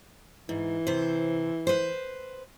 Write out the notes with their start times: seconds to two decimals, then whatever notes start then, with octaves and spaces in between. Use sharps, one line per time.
0.49 G#2 E3
0.87 C3 C5
1.67 B4 C5